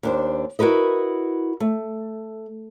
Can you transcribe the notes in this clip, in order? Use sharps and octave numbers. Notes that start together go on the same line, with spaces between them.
D#2 D4 C5
E4 F#4 A#4 B4 D#5
A3